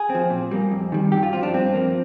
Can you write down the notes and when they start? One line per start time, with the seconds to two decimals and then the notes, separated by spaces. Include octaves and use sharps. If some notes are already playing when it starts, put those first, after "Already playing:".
Already playing: G#4
0.10 F3 C4
0.30 A#2
0.51 G3 A#3
0.72 F2
0.92 D#3 G3
1.12 G2 G4
1.23 F4
1.33 F3 C4 F4
1.43 D4
1.54 G2 C4
1.74 F3 A#3